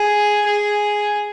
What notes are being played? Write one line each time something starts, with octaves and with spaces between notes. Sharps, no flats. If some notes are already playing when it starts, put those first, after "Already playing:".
Already playing: G#4
G#4